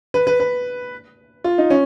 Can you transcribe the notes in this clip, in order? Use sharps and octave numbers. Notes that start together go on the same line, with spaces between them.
B4
B4
B4
F4
D#4
C#4